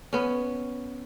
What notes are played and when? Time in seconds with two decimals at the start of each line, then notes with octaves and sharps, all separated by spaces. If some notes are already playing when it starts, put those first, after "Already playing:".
0.13 B3 C#4